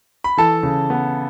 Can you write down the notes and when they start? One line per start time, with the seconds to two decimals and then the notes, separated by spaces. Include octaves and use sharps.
0.24 B5
0.37 E3 A4 A5
0.63 C#3
0.90 B3